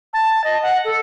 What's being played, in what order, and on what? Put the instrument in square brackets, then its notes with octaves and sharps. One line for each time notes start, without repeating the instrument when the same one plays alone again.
[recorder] A5
D#5
F#5
A4